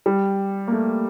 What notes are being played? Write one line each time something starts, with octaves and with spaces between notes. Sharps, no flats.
G3
A#3
A3